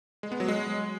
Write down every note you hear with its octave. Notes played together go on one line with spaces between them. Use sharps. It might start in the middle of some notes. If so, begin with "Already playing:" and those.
G#3
B3
F#3
G#3